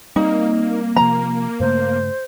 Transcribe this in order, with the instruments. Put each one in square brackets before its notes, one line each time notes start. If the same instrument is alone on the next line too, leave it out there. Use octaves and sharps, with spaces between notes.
[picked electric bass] G3 C4 [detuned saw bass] A#3 [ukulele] D#4
[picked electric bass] C3 F3 [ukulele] A#5
[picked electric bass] G2 C#3 A3 [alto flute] C5